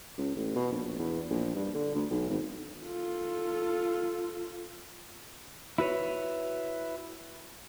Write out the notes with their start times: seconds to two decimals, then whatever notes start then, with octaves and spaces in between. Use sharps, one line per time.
0.18 C#2
0.35 A1
0.55 B2
0.72 A#1
0.99 E2
1.30 A#1
1.55 G2
1.74 D3
1.95 D2
2.10 B1
2.30 G#1
2.84 F4 A4
5.78 E4 F#4 B4 C#5